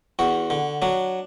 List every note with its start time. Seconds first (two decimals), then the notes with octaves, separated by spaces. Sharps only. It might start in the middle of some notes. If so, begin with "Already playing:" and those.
0.19 E2 F#4
0.50 D3
0.82 F#3 D4